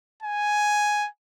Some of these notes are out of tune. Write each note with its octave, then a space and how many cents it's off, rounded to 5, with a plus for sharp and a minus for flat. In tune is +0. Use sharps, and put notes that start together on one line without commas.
G#5 +5